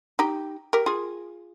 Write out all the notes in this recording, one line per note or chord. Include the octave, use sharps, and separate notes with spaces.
D#4 G4
G4 A#4
F4 G#4